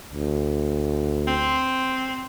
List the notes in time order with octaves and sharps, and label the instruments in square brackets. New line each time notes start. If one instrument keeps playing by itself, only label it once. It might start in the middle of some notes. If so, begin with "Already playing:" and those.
[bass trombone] D2
[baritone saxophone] C4